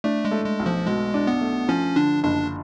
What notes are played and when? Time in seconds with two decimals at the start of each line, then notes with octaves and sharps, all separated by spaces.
0.04 A3 D4
0.25 G#3
0.31 A3
0.45 G#3
0.59 B1
0.66 F3
0.86 B2 G#3
1.14 D4
1.27 B3
1.41 A3
1.69 F3 C#4
1.96 D3 D4
2.23 F#1 D4